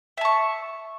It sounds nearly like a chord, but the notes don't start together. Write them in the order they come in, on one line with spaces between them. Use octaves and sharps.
E5 A5 C#6